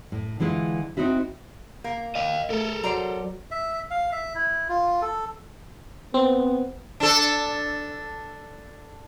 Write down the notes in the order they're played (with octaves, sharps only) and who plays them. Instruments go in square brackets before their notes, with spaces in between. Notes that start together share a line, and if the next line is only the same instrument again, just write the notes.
[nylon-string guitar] A2
D3 E3 G#3 E4 F4
C4 D#4 E4 F#4 E5
[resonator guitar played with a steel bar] A#3
[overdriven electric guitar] D#5 F5
[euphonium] A3 [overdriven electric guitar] A4 A#4
[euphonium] F#3 [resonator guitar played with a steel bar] C5 D5 A#5
[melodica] E5
F5
E5
E4
F4
A4
[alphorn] B3 [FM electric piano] C4
[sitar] D4 A4